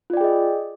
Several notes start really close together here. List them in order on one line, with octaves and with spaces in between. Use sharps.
F4 D5 G5 G#4 D#5